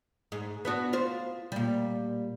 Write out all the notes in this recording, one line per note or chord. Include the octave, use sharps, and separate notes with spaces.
G#2
B3 D4 F#4
F4 C5
A#2 G3